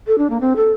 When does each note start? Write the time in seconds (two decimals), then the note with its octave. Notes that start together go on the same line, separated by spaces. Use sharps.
0.07 A4
0.18 D4
0.30 A#3
0.40 C4
0.56 A4